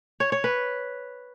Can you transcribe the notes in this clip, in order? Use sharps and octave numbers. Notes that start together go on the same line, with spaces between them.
C#5
C#5
B4